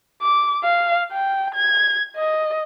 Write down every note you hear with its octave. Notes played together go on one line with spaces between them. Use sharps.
D6
F5
G5
G#6
D#5